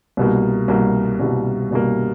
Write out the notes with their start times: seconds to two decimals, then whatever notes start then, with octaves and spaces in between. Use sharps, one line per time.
0.17 C2 B2 G3 A#3
0.68 C2 B2 G3 A#3
1.20 C2 B2 G3 A#3
1.71 C2 B2 G3 A#3